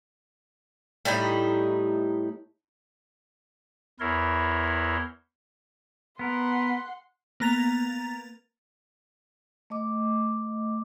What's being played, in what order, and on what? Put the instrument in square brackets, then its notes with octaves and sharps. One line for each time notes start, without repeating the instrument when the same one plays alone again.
[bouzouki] A2 G3 D#4 E4
[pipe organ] E2 E4 A#4 C#5 C6
[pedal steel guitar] B3 A#4 [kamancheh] F#5 C6
[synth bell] A#3 B3 A#5 A6 F7
[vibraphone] A3 D#5 D6